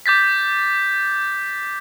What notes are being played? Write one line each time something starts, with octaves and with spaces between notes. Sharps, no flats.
D6 G6 A6 B6